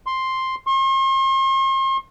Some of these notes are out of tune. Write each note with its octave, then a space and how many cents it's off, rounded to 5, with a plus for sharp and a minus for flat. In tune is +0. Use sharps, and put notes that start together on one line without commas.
C6 +5
C6 +45